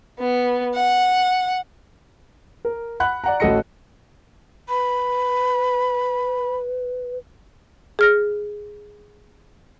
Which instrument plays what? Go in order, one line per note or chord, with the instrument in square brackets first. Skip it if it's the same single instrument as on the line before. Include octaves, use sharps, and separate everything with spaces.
[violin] B3
F#5
[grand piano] A#4
F#5 B5 F#6
D5 F#5 A#5
A1 F#4 A4 D#5 A#6 C#7
[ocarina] B4 [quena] B5
[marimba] G#4 F6 A#6